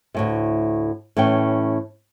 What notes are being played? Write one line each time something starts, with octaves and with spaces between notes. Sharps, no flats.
D2 A2 C3
A2 E3 C#4 G5